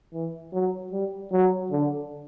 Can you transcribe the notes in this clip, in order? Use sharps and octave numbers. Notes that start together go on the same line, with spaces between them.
E3
F#3
G3
F#3
D3